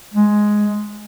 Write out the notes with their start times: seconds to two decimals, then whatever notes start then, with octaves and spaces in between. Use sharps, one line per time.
0.14 G#3